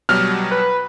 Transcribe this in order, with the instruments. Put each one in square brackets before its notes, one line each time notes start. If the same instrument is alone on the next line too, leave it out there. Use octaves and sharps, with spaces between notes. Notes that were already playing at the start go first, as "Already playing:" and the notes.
[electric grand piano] B2 F#3 G3 [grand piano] F6
[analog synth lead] B4